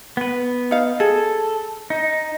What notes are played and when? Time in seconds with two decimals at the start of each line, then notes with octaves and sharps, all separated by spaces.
0.17 B3 B4
0.71 D#4 F5
1.00 G#4 A4
1.90 D#4